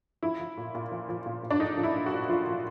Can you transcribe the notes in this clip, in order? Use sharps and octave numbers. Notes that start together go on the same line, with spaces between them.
F3 E4
F3
A#2
A#2
F3
F3
A#2
A#2
D4
F3 D#4
F3
E4
A#2
F#4
A#2
F3 F4
F3